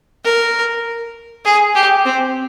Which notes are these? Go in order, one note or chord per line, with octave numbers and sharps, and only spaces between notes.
A#4
G#4
G4
C4